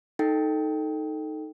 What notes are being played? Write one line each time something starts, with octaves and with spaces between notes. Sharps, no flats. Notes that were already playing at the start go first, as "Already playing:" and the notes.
D#4 A4 G5